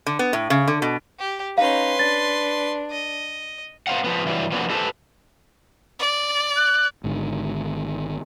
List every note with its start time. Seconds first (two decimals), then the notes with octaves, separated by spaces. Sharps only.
0.06 D3
0.19 B3
0.33 A2
0.50 C#3
0.68 D3
0.82 B2
1.19 G4
1.58 C#4 D#4 B4 F5 C6
1.99 D4 A6
2.91 D#5
3.87 B3 C5 F5 F#5
4.04 F3 B3
4.26 G2 E3 F#3 G3
4.52 F3 A#3 B3 D4 F#4
4.70 G4 A4 B4 C5 A5
5.99 D5
6.57 F#6
7.04 G#1 G#2 D3 D#3